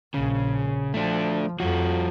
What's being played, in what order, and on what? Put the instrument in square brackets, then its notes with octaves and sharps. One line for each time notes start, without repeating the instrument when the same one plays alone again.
[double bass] A#1 [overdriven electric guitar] C#3
[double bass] F3 [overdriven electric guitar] A3 D4
[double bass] F2 [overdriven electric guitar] F3 F#4